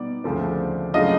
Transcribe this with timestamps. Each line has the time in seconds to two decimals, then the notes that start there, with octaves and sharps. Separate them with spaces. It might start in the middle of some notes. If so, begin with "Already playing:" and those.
Already playing: B2 G3 B3 D#4 D5
0.24 D2 C#3 F3 A3 C4
0.94 C#3 F#3 A3 D4 F4 D#5